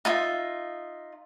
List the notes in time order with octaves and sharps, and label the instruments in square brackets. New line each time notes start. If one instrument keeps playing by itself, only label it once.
[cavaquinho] D#4 F4 E5